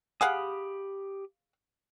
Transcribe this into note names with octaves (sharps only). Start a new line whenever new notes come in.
G4 G#4 F5 F#5 B5 D#6